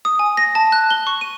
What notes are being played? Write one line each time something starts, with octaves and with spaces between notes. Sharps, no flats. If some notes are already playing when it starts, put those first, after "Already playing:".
D#6
G#5
A#6
A5
F#6
G7
C#6
D#7